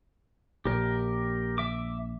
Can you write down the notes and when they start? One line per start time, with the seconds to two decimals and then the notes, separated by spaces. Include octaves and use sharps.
0.65 A#1 G4 A#4
1.58 E5 D6